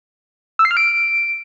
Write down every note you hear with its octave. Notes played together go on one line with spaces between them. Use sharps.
E6
C7
F6
D7